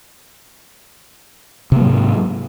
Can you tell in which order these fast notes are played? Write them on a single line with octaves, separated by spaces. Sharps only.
C3 A#3 F#3 G#2